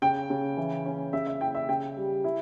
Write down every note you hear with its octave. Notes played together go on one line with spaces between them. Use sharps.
C#3 G5
C#3
E3
C#4
C#3 E5
E5
E4 G5
E5
C#3 G5
G3
E4